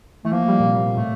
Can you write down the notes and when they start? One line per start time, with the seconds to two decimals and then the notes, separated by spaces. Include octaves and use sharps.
0.25 E3 A3
0.32 F3 A#3
0.48 G3
0.60 A#2
0.65 C3
0.97 A2 A3